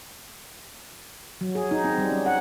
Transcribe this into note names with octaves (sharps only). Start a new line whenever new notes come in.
F#3
G#4
D#4
C4
G3
C#4
F#5